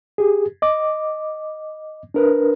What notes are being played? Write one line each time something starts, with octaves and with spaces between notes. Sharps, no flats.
G4 G#4
D#5 D6
D4 A#4 B4